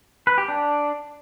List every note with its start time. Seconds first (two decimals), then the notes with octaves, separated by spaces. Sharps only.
0.27 B4
0.38 G4
0.48 D4